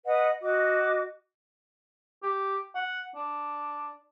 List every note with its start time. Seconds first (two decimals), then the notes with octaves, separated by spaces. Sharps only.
0.05 B4 D#5 F#5
0.42 F#4 D#5 D6
2.23 G4
2.75 F#5
3.15 D4